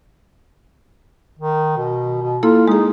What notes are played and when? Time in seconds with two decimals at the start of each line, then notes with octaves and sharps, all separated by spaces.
1.39 D#3
1.77 B2
2.21 B2
2.43 A#3 E4 F4 A4
2.68 G#3 D#4 G#4